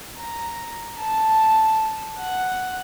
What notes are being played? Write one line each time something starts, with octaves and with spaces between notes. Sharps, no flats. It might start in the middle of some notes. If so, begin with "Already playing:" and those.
A#5
A5
F#5